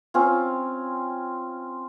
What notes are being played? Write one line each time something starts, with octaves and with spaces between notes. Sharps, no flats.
C4 C#4 F4